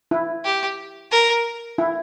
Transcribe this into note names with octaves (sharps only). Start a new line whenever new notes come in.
E4
G4
A#4
E4